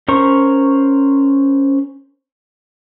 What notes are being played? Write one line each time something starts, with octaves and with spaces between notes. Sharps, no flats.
C#4 A#4 C5 C#6